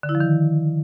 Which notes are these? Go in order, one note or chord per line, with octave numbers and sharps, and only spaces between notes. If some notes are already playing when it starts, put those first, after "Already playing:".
D3
E4
F3
D#3